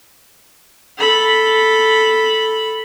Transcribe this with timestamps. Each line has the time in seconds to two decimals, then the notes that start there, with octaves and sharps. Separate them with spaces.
0.98 A4 B5